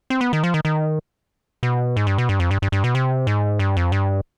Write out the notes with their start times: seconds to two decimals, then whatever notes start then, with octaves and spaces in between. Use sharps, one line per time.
0.10 C4
0.21 B3
0.33 D#3
0.43 F3
0.54 D#3
0.65 D#3
1.63 B2
1.96 G#2
2.07 G2
2.18 B2
2.29 G2
2.40 F2
2.51 G2
2.62 G2
2.72 G2
2.84 B2
2.95 C3
3.27 G#2
3.59 G2
3.77 F2
3.92 G2